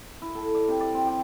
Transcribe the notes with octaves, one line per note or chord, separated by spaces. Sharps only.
E4
A4
D5
C3
D5
C4
G4